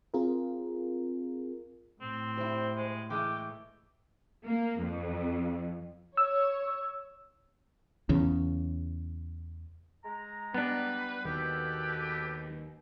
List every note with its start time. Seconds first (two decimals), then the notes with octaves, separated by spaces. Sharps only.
0.14 C4 F4 G#4 A#4
2.01 A2 C4
2.37 G3 E4 C5
2.77 G#3
3.10 E3 G#3 A3 G5 D6
4.46 A#3
4.82 F2
6.17 C#5 E6
8.09 E2 C#3
10.05 G#3 A#5
10.54 G3 B3 D4 B4
11.25 D#2 B2 D#3 G4 A4 B4